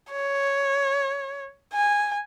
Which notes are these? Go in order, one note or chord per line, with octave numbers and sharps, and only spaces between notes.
C#5
G#5